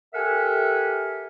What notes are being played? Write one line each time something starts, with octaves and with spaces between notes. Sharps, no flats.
G4 A4 A#4 E5 F#5 G#5